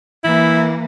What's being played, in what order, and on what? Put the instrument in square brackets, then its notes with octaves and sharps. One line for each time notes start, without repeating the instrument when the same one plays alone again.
[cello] E3 A#3 [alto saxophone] E4